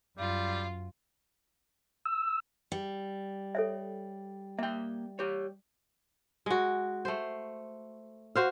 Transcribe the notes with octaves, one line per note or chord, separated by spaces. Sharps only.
F#2 G3 F4
E6
G3
A4 C#5 E5
A#3 E5 G5
G4 C#5
G#3 F#4
A3 C5
F#4 C5 F5